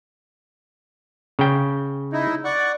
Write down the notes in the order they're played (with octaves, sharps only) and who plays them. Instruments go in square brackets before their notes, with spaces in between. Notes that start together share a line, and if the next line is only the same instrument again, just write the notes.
[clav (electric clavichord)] C#3 G5
[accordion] D#4 E4
D5 F#5 C#6